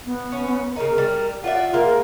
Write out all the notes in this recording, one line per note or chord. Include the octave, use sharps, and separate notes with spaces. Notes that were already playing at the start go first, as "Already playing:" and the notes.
B3
C#4
C#3 D#4 A#4
G3
F4 D5 E5 F#5
G#3 A#3 A#4